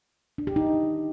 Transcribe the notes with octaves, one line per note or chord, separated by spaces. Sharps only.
D4
G4
D#4